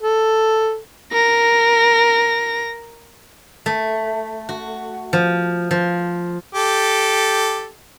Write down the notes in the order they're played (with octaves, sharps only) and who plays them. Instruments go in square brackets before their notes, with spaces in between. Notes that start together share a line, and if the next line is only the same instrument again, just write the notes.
[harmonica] A4
[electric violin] A#4 A#6
[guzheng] A3
F#4
F3
F3
[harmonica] G4 A4